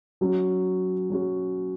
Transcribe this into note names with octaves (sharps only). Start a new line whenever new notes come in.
F#3 C#4 F#4
F#3 C#4 F#4